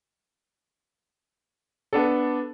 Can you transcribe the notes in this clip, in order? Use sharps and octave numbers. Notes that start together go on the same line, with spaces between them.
B3 D4 A4